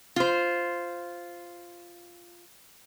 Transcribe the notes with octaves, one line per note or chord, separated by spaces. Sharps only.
F4 C5